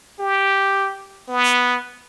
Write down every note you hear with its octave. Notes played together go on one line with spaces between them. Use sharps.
G4
B3